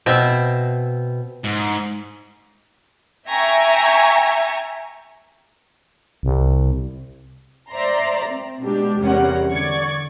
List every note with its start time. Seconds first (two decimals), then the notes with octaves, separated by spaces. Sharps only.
0.06 B2 C4 E5
1.44 G#2
3.26 E5 G5 G#5 A#5 C#6
6.23 C2
7.70 C5 D5 E5 A#5 C6
8.26 C4
8.63 B2 G#3 D4 G4
9.00 E2 C3 G3 C#4 A#4 F#5
9.51 D3 D5 C#6 G#6